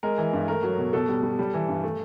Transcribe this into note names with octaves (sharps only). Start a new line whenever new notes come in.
G#3 A#4
E3
G2
A3 A#4
F#3
B2
B2 A4
G3
G3
G3
E3
G2
A3